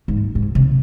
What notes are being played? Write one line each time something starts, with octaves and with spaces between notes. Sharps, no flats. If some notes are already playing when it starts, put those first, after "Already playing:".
G#2
G#2
C3